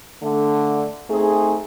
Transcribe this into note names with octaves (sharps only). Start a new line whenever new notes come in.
D3 A3
A3 C4 D#4 G#4